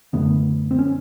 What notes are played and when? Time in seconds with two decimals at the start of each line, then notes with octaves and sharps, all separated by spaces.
0.13 F#2 D3 A3 B3
0.71 C4
0.79 C#4